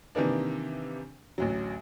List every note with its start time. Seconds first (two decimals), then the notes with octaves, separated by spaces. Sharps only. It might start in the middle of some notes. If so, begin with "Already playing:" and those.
0.15 C3 D#3 E3 A#3 D4
1.38 A1 D2 F#3